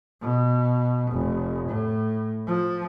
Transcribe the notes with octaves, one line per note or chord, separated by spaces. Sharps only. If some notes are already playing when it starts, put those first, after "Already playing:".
B2
F1
A2
F3